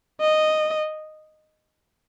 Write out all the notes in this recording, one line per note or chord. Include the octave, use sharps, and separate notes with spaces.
D#5